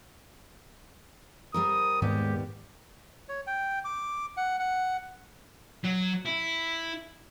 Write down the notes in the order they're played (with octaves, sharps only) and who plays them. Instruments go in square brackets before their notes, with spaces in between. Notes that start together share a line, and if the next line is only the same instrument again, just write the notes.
[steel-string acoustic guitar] G3 C4 A#4 [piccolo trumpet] D#6
[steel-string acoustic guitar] D#2 G3 B3 [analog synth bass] G#2 [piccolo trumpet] G4
[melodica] C#5
G5
D6
F#5
F#5
[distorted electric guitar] F#3
E4